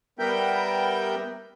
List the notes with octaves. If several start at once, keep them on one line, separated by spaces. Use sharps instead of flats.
G3 B3 A#4 E5 G5 G6